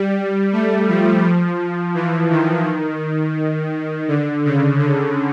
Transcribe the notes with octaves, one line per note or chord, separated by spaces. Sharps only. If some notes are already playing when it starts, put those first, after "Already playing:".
Already playing: G3
A3
F3
F3
E3
D#3
D3
C#3
D3